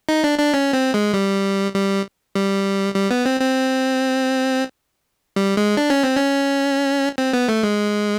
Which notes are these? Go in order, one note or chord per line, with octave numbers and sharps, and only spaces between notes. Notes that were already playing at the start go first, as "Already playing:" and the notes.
D#4
D4
D4
C#4
C4
G#3
G3
G3
G3
G3
B3
C4
C4
G3
G#3
D4
C#4
C4
C#4
C4
B3
A3
G#3